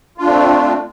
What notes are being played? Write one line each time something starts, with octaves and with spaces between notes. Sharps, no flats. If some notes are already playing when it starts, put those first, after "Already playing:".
A3 C4 D4 F4